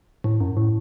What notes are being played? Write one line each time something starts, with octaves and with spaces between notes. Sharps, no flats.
A2
F#2
A2